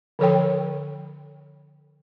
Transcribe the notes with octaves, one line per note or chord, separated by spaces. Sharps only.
D3 F3 A4 C#5 G5